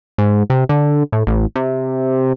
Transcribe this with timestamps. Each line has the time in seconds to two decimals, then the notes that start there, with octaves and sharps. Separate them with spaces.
0.18 G#2
0.50 C3
0.69 D3
1.12 A2
1.27 A1
1.55 C3